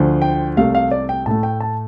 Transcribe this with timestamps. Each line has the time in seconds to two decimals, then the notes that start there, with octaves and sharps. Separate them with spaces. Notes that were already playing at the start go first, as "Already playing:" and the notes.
Already playing: D2 D3 F3
0.22 G5
0.57 C2 C3 A3 F5
0.75 F5
0.91 D5
1.09 G5
1.26 A2 A3 A5
1.43 G5
1.60 A5